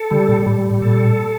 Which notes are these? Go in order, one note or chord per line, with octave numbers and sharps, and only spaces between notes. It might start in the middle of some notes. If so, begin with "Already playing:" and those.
Already playing: A4
D3 G3
A#2
A2 G3
A2
A#2 A4